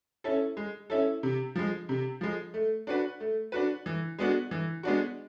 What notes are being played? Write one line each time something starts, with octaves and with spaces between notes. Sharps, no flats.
C#4 E4 A4
G#3
C#4 E4 A4
C3
F3 G#3
C3
F3 G#3
A3
D4 F#4 B4
A3
D4 F#4 B4
E3
G#3 B3 D4 F#4
E3
G#3 B3 D4 F#4